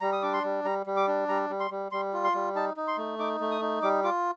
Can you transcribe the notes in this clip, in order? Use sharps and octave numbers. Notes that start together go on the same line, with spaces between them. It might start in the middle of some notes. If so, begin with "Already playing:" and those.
G3 A#5
D#6
D4 D6
C6
G3
G3 A#5
G3
D6
D4
G3 A#5
G3
C6
G3
G3 C6
F4
C6
G3
D#4 A5
D#4
C6
A3
D#4 D6
A3
D#6
D#4
G3 D6
F4 D6